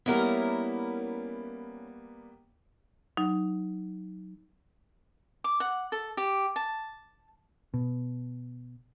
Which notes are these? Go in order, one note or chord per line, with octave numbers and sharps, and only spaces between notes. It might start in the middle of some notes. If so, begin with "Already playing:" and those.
G3 A#3 B3 C#4 E4 A#4
F#3 D#4
D6
F#5
A4
G4
A5
B2